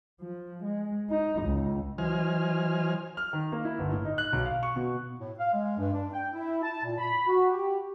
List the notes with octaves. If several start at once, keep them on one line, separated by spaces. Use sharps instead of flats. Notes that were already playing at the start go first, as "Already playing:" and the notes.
F3
G#3
D#4
C#2
E3 F#3 C5 D#5 G#5 F6
F6
D#3
A#3
E4
G1
A2
D#4
F#6
B1
F5
C#6
B2
A2
F5
G#3
G2
D4
G5
E4
A5
A#2
B5
F#4
G4